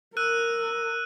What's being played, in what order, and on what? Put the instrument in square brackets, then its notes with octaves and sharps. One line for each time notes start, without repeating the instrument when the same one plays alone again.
[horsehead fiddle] A#4 [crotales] E6 F#6 D#7